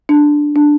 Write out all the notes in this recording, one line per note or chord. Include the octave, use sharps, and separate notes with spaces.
D4
D4